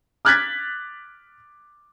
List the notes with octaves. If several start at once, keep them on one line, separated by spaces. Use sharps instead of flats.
D6 F6 F#6 G#6 A6 B6